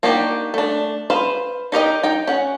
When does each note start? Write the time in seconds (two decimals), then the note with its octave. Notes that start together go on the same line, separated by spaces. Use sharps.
0.03 A#3 D4 D#4 F#4 G4
0.54 A3 D4
1.10 B4 C5 F5
1.72 D#4 G4 A#4 D#5
2.03 D#4 G5
2.27 C#4 F#5